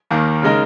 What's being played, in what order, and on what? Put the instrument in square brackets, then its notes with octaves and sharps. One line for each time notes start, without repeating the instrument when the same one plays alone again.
[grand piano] D#2 D#3 A#3
C#3 G#3 D#4 A#4